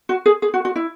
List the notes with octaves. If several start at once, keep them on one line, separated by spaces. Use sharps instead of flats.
F#4
G#4
G#4
F#4
F#4
E4